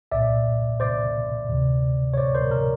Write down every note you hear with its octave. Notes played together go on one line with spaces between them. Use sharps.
C2 A#2 D5 E5
C5 D5
D2 C3 D#3
C#5
C5 D5
A#4 C5
A#4